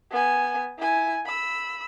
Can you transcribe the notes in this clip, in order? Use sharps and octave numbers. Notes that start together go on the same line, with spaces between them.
B3 G#5
E4 G#5
B5 E6